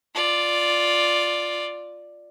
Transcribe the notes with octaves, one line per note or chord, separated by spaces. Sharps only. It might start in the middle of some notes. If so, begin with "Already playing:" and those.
F4 D5